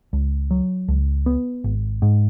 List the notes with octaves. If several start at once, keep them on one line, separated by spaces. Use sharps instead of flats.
C#2
F#3
C#2
B3
G#1
G#2